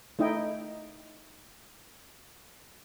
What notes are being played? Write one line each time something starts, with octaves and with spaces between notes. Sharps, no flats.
A3 D#4 E4 D#5 G5